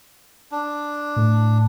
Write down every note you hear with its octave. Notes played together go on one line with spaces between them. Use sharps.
D4
A2